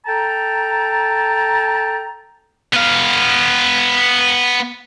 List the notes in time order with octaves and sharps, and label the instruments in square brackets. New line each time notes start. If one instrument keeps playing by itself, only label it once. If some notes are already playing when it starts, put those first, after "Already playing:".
[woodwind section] A4 G5 A5 A#5
[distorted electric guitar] B3 F5